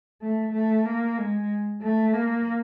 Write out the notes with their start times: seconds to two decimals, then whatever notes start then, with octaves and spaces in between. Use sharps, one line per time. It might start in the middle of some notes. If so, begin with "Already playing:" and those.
0.22 A3
0.53 A3
0.85 A#3
1.17 G#3
1.81 A3
2.13 A#3